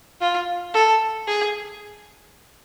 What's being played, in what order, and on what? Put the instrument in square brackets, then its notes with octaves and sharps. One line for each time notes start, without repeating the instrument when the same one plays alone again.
[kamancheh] F4
A4
G#4